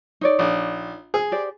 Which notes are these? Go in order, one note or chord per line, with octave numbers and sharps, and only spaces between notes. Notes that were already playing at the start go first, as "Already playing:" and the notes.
D#4 C#5 D5
A#1
G#4
G4 C5 D5